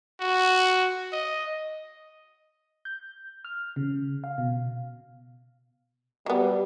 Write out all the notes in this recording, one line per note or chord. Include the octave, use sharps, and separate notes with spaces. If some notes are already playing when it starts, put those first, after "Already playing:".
F#4
D#5
G6
F6
C#3
F5
B2
F#3 G3 B3